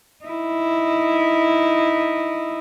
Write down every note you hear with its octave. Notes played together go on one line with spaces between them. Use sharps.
D#4 E4